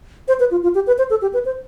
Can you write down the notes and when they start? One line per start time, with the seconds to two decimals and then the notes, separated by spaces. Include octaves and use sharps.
0.28 C5
0.40 B4
0.51 F4
0.63 F4
0.75 G4
0.87 B4
0.98 C5
1.10 A4
1.22 G4
1.34 B4
1.45 C5